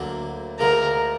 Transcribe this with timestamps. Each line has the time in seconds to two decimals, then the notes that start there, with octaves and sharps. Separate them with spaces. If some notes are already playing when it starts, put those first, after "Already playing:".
Already playing: D2 D3 F#3 A#3
0.59 D2 D3 F3 G#3 A#4